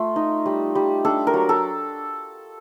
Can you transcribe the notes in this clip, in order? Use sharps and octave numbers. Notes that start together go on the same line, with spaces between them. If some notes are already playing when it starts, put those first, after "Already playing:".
Already playing: A3 F4
D#4
G3
G3
D4 A4
A#4
F#3
A4